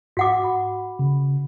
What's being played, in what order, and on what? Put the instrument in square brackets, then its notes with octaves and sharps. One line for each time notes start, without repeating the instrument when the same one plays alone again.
[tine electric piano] G#2 [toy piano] F#4 F#5 D6
[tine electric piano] B5
C#3